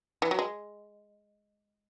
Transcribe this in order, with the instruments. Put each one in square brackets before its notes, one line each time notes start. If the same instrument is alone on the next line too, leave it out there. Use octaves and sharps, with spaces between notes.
[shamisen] E3
F#3
G#3